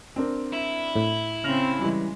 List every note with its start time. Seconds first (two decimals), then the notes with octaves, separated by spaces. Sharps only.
0.16 C4 D4 A#4
0.53 E4
0.96 A2
1.44 C#3 C4 F6 A#6 F7
1.81 E3 G3 G#3